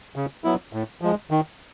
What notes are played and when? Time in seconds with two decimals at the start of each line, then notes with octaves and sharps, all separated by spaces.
0.16 C#3
0.44 F#3 B3 E4
0.73 A2
1.01 F3 G#3
1.31 D#3